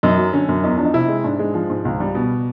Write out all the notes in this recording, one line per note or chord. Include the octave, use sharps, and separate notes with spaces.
F#2 D#4
F#3
D3 C#4
F#2
E2 D#4
F3 D4
D#4
C3 E4
G#3
G#2 D4
G#3
F3
G#2
C#2
G3
B2